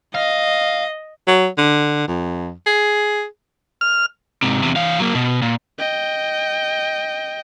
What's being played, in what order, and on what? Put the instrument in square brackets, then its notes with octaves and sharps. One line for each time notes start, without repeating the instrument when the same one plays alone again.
[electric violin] D#5 [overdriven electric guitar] F5
[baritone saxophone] F#3
D3
F2
G#4
[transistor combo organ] F6
[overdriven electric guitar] G#2 C3
E2 C3
E3 F5
F#3 A#3
B2
A#2
[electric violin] D#5 G5